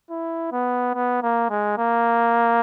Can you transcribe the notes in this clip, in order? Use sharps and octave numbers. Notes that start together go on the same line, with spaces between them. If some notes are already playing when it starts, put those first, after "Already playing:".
E4
B3
B3
A#3
G#3
A#3